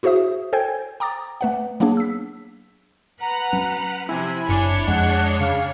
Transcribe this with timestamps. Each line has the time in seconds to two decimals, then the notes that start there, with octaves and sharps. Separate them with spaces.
0.03 E4 F#4 G#4 C5 E5 D#6
0.53 A4 C5 G5 G#5 G#6
1.00 G5 A#5 D6 D#6 A6
1.41 A3 B4 F#5
1.80 F#3 A#3 B3 D4 G#4
1.97 E6 B6
3.21 B4 F#5 A#5 F6
3.53 F#3 C#4
4.09 C3 F3 E4 G#5
4.49 F#1 D4 C#5 C#7
4.88 F2 G#3 F#5
5.40 C#3 F5